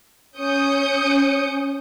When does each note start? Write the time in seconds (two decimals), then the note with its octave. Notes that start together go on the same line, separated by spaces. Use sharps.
0.38 C#4 D#6 G6 C#7